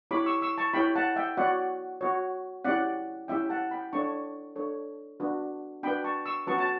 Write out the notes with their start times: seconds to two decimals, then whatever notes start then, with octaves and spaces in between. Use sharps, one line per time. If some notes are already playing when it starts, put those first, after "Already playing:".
0.11 E4 G4 C#5 B5 D6
0.26 C#6 E6
0.42 C#6 E6
0.58 A5 C#6
0.73 E4 G4 C#5 G5 B5
0.96 F#5 A5
1.16 E5 G5
1.37 F#4 C#5 D5 F#5
2.01 F#4 C#5
2.65 C#4 E4 G4 D5 F#5
3.28 C#4 E4 G4 E5 G5
3.49 F#5 A5
3.71 G5 B5
3.92 D4 A4 C#5 A5 C#6
4.56 D4 A4 C#5
5.20 D4 F#4 B4
5.83 D4 F#4 B4 G5 B5
6.04 A5 C#6
6.26 C#6 E6
6.47 C#4 F#4 B4 A5 C#6
6.58 A5